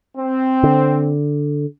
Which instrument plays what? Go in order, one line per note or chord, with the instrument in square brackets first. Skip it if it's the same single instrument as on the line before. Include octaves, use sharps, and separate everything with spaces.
[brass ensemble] C4
[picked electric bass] D3